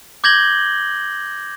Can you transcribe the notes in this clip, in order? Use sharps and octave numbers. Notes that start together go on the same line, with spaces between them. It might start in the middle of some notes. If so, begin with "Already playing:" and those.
D6 G6 G#6 A#6 F#7 G7